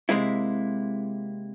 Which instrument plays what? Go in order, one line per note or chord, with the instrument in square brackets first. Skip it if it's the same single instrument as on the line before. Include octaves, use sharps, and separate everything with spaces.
[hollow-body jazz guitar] C3 G#3 A#3 E4